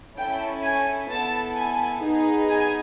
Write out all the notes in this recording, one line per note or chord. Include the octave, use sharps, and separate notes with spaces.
C#4 E4 A4 G5
G#5
B3 E4 A4 A5
G#5
B3 D#4 G#4
G#5